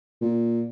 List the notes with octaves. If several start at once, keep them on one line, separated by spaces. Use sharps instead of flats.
A#2